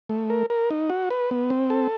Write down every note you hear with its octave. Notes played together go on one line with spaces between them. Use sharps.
A3
A#4
A#4
D#4
F#4
B4
B3
C4
A4